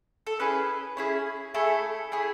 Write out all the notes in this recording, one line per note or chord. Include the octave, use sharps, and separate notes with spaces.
A4
C#4 E4 G#4 B4
C#4 E4 G#4
A3 E4 G#4 A4
A3 E4 G#4